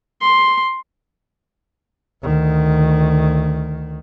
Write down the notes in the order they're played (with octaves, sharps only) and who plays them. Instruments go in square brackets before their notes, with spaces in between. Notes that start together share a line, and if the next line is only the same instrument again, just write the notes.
[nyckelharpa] C6
[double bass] D2 D#3